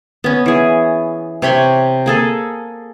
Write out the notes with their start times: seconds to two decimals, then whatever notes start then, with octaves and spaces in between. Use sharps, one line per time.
0.24 B3 C#4
0.46 E3 G#4
1.42 C3 C#5 B5 C6
2.06 A#3 G#4 A4